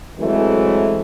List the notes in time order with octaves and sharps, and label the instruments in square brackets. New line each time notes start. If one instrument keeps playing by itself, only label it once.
[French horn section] E3 F#3 G#3 A3 C4